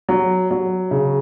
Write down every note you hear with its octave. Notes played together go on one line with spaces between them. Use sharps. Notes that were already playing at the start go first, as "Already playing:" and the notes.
F#3
F#3
C#3